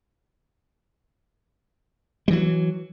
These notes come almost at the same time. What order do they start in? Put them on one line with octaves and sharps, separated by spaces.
G3 E3 F#3